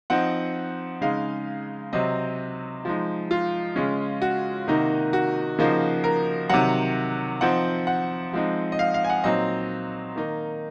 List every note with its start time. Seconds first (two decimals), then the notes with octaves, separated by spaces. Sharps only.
0.10 F3 C4 D#4 F#5
1.01 C#3 G#3 D#4 F5
1.93 C3 F#3 C4 D#5
2.85 F3 G#3 D#4
3.31 F4
3.76 C#3 G#3 C#4
4.22 F#4
4.68 C3 D#3 A#3 D#4
5.13 F#4
5.59 C#3 F3 A#3 D#4
6.04 A#4
6.49 C3 D#3 F#3 F#5
7.41 F3 C4 D#4 F#5
7.87 F#5
8.33 F3 G#3 C4 D#4
8.72 D#5
8.79 F5
8.94 F5
9.04 G#5
9.10 F#5
9.24 A#2 F#3 C4 D#4 D#5
10.16 D#3 A#3 D#4